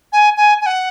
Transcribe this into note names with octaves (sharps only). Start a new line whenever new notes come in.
G#5
G#5
G#5
F#5